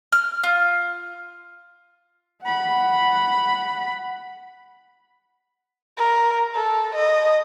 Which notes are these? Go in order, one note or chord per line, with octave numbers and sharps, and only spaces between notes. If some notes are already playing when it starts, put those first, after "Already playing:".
F6
F4
F#5 B5
A#4
A4
D#5